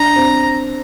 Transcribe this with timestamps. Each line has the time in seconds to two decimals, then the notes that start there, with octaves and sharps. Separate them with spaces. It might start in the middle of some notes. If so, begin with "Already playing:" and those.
Already playing: D4 A#5
0.16 C4